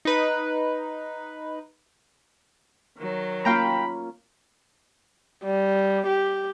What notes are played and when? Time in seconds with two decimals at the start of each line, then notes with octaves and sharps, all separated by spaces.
0.05 D#4 B4
2.98 D#3 F#3
3.45 A#3 C#4 F4 F5 G5 A#5 B5
5.44 G3
6.07 G4